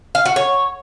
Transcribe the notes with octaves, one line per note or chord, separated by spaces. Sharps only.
F5
F#4
C#5